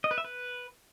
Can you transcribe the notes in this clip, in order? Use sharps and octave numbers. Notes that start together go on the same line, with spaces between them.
D#5
B4
E5
B4